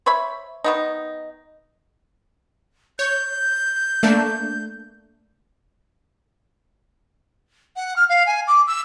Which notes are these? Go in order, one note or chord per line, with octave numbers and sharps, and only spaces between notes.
C5 C#5 E5 B5
D#3 B3 D#4
C#5 G6
A3 A#3 D4
F#5
F6
F5
G#5
D6
E6